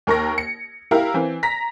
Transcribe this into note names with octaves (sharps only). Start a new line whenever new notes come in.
D#2 A#4 C#6 A#6
C#7
E4 G4 A#4 F5
E3 C4
A#5 A#6 B6